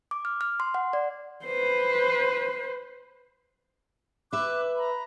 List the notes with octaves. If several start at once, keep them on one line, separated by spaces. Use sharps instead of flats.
D6
F6
F6
C6
F#5
D5
B4 C5
B4 E5 D6 F#6
A#5 B5